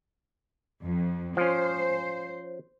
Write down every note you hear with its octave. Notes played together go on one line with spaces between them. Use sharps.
F2
F3 C#4 C5